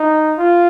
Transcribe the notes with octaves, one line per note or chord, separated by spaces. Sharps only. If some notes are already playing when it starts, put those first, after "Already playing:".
Already playing: D#4
F4